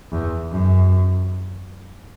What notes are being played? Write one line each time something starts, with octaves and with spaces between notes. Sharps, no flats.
E2
F#2